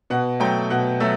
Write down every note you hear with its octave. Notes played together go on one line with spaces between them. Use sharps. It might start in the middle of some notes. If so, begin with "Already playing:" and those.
B2 F#5
F#3 A3 G5
B2 F#5
F#3 A3 E5